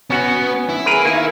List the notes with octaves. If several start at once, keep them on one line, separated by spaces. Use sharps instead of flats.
B3 C#4 F#4 F#5
E4
G#4 A#4 B4
D#3 A#3